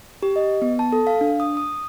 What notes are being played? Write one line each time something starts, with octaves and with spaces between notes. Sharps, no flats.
G4
D#5
B3
A5
A4
F5
D4
D#6
D#6